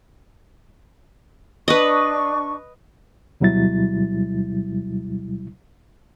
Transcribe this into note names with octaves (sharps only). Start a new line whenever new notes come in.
D4 B4 D#5 C#6
D2 B2 F#3 G3 E4 A6